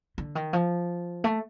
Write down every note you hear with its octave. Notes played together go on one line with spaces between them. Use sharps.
D3
D#3
F3
A3